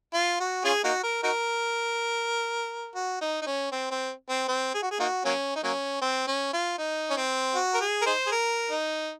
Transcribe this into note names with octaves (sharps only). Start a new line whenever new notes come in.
F4
F#4
C#4 F4 G#4
A#3 D#4 F#4
A#4
D#4 F#4 A#4
F#4
D#4
D#4
C#4
C4
C4
C4
C4
G#4
F#4
G#4
A#3 D#4 F#4
F#3 A#3 C#4
D#4
F#3 A#3 C#4
C4
C#4
F4
D#4
C#4
C4
F#4
A#4
G#4
A#4
D#4 G#4 C5
G#4
A#4
D#4